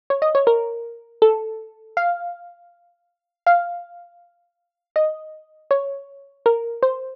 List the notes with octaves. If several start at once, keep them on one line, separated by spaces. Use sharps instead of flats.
C#5
D#5
C#5
A#4
A4
F5
F5
D#5
C#5
A#4
C5